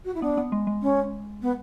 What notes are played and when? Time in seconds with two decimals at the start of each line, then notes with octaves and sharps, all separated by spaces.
0.04 F#4
0.14 E4
0.22 B3 D4
0.37 B3
0.52 G#3
0.67 G#3
0.82 C#4
1.42 B3